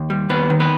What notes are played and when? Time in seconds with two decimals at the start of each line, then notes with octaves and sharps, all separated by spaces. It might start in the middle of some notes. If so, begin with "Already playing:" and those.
Already playing: D#2
0.10 G3
0.29 D#2 B3 B4
0.50 D#3
0.60 B3 B4